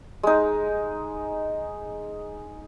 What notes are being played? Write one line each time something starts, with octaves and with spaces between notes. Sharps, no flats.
G#3 D#4